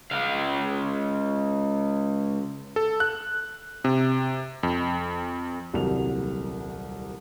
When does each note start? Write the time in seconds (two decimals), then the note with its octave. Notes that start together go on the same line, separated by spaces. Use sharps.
0.11 C#2 F5
2.76 A4
3.00 F#6
3.84 C3
4.63 F2
5.73 D#1 C2 F#3 G3 A#4 F7